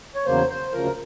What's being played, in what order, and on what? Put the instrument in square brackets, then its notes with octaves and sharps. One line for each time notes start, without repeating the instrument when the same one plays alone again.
[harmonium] C#5
E2 C#3 F#3 A#3 C5
C5
D2 C#3 F3 A#4